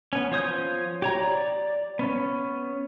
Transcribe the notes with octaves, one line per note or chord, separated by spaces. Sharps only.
B3 C#4
F3 C#5 D#6 G6
G4 C#5 A#5
D5
B3 C#4